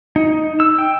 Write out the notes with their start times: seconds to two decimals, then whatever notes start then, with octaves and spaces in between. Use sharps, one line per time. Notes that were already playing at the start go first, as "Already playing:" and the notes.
0.16 D#4
0.60 E6
0.78 G5